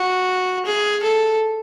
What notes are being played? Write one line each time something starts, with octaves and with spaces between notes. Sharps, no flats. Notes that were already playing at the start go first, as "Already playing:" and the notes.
Already playing: F#4
G#4
A4